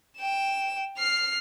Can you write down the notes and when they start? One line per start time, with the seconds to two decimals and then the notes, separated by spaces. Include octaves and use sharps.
0.18 G5 E7
0.98 F6 C7